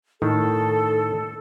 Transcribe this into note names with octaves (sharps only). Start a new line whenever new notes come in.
A2 D#3 A4